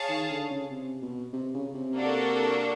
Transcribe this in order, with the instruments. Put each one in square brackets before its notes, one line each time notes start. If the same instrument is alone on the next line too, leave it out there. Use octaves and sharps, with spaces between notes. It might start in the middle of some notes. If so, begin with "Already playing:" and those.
Already playing: [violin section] G#4 C#5 F5 A5
[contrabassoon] D#3
D3
C#3
C3
B2
C3
C#3
C3
[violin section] A#3 D4 F#4 A4